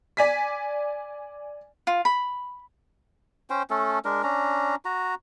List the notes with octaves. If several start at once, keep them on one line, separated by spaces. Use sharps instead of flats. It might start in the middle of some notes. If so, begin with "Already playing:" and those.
D5 G#5 B6
F4
B5
C#4 C5 G5
A3 C#4 A4
G#3 D4 A#4
C#4 D4 A#5
F#4 A#5